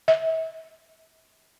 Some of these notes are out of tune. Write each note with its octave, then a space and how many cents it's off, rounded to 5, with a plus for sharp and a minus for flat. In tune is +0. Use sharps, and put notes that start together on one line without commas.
E5 -35